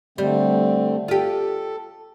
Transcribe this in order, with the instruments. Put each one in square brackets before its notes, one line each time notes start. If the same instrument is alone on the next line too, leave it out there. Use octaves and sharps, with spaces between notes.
[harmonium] D3 A3 C4 [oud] G3
[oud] F4 G4 [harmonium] A4